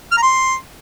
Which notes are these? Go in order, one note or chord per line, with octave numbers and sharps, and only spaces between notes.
F6
A#5
C6